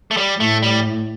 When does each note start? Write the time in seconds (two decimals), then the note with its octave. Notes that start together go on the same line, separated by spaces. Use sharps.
0.11 A3
0.17 G3
0.40 A2 A3
0.62 G3